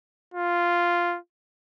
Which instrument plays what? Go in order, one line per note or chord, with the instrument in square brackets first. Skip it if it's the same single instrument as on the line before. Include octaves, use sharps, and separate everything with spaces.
[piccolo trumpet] F4